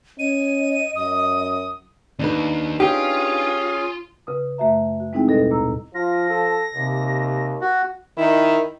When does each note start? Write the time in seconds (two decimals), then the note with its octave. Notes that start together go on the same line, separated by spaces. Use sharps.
0.19 C#4 D#5 D#7
0.96 F#2 D#6
2.19 D#2 D4 D#4 B4
2.80 C#4 F4 G4 G#4
4.27 C#3 B4 D#6
4.58 F#2 A3 F#4 E5 A#5
5.00 F#4
5.13 G#3 C4 D#4 E4 G#4 G5
5.28 D#2 B2 G3 A4 D#5 A#6
5.51 D#2 A#2 A#5 E6
5.94 F3 F4 A#6
6.30 A4
6.75 D#2 C3
7.61 F#4
8.17 D#3 E4